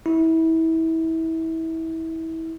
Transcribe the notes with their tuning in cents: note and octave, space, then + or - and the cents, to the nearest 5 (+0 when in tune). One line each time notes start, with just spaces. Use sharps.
E4 -25